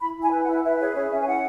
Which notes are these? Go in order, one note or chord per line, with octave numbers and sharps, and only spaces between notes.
E4 B5
E4
G#5
B4
F#5
E4
B4 E5
G#4 C#5
C#4 C#5
C#4 E5
G#5
E4 F#5